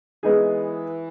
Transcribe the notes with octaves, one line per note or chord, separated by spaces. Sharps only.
E3 G#3 B3 D#4 G#4